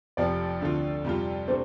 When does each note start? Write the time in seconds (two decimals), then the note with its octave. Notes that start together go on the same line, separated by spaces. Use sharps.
0.17 F1 F2 C3 F3 D5
0.61 D2 D3 A3 C4 F4
1.04 F2 C3 G3 C4 F4
1.48 C3 A3 D4 C5